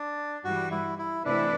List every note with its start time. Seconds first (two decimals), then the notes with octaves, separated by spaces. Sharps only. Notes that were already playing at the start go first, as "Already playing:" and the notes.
Already playing: D4
0.44 G2 E3 G3 F#4
0.71 E4
0.98 E4
1.25 C3 E3 A3 D4 E4 B4